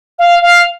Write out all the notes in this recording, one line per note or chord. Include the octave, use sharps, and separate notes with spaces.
F5
F5